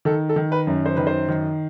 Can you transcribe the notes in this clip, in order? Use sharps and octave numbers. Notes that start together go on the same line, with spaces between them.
D#3 A4
A4
D#3
B4
F#2
C5
D#3 B4
C5
D#3